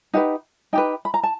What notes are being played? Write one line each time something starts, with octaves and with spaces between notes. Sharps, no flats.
D#4 G4 B4 F#5
D#4 G4 B4 G5
B5
A#5
A5